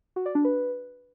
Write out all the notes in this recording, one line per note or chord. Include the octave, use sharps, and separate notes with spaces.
F#4
D5
D4
B4